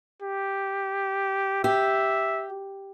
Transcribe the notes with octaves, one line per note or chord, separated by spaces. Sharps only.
G4
G4 E5